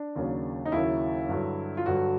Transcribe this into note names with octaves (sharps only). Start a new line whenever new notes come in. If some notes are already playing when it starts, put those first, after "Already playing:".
Already playing: D4
D#2 C#3 F#3 A#3
D#4
D#2 C#3 F#3 A#3 E4
G2 D3 F#3
F4
G2 D3 F#3 F#4